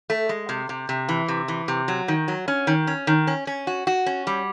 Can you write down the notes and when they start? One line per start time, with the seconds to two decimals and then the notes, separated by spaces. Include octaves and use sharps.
0.10 A3
0.29 G#3
0.49 C3
0.69 C3
0.89 C3
1.09 E3
1.28 C3
1.48 E3
1.68 C3
1.88 F#3
2.08 D#3
2.28 F#3
2.48 C#4
2.67 D#3
2.87 C#4
3.07 D#3
3.27 C#4
3.47 C#4
3.67 F#4
3.87 F#4
4.06 C#4
4.27 G3